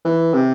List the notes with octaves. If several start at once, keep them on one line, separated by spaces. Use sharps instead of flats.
E3
C3